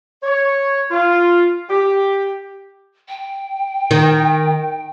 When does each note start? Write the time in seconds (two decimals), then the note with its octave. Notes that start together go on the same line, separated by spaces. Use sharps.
0.23 C#5
0.90 F4
1.70 G4
3.09 G5
3.91 D#3